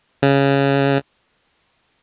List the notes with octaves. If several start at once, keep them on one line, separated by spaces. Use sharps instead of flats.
C#3